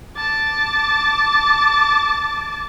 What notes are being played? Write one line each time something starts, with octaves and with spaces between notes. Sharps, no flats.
A5 D6